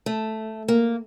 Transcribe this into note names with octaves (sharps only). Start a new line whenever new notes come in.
A3
A#3